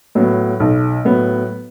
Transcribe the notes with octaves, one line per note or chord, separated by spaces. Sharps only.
A2 F#3 B3
B1
A2 F#3 B3